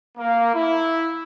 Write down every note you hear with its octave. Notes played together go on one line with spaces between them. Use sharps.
A#3
E4